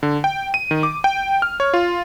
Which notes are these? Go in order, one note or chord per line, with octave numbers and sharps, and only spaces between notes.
D3
G5
D#7
D#3
D6
G5
F6
C#5
F4